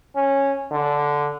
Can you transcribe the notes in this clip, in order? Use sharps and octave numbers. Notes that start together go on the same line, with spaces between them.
C#4
D3